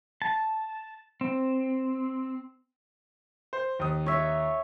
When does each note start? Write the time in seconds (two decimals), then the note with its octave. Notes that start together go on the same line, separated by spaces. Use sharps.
0.22 A5
1.21 C4
3.53 C5
3.79 D#2 D#6
4.06 C#5 E5